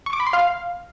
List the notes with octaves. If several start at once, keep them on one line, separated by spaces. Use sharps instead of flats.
C#6
D6
B5
C6
F5